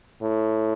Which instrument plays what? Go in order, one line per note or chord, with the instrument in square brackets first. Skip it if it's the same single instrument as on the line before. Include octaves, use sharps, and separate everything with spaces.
[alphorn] A2